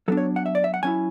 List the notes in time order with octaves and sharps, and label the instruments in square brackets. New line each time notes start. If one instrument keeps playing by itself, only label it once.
[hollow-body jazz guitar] F#3 B3 D4 A4
C#5
F#5
E5
D5
E5
F#5
F#3 C#4 E4 G#5